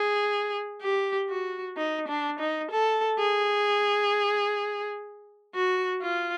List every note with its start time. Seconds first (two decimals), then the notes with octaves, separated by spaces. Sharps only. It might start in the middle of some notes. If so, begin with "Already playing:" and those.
Already playing: G#4
0.82 G4
1.29 F#4
1.77 D#4
2.08 D4
2.39 D#4
2.71 A4
3.18 G#4
5.55 F#4
6.02 F4